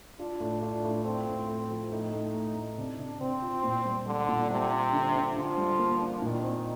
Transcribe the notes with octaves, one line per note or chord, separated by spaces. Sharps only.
D4 F4
A2
D4 F4
A2
C4 F4
A2
A2
F3
A2 D#4
A3
A3
A2
C3 D4
C3
C3 C4
F4
A#2
G3
D3 G3
A#2
C3 G3
D4
D3
D3
D3 F3
G3
A#3
D4
A#2 D#3
C4